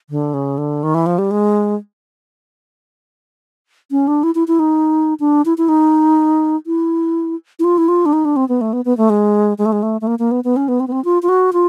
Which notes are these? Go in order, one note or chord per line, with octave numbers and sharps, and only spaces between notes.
D3
C#3
D3
D#3
E3
F3
G3
G#3
C#4
D4
E4
E4
E4
D#4
D4
E4
E4
D#4
E4
E4
F4
E4
F4
D4
D#4
D4
C4
B3
A3
B3
B3
A3
G#3
G#3
A3
G#3
A3
A3
A#3
A#3
B3
B3
C#4
B3
C4
B3
C4
F4
F4
F#4
F4